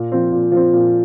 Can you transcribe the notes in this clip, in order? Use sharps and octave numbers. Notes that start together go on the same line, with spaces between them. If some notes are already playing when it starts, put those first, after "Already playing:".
Already playing: A#2
F3 C4
A#2
F3 C4
A#2